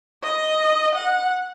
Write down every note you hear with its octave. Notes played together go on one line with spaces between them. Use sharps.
D#5
F#5